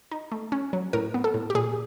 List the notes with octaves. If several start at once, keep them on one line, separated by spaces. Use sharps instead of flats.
D#4
A3
C#4
F#3
A2 A#4
B3
A4
A2
G4
A#2 G#4